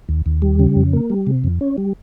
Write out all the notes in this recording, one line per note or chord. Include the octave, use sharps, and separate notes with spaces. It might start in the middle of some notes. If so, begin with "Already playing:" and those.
D#2
D#2
G3
C#3
F2
A#3
G3
C3
F2
C#4
G3